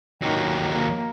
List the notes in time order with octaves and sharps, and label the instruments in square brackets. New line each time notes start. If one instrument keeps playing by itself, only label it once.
[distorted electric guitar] D#2 F#3 [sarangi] D#3
[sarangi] A#3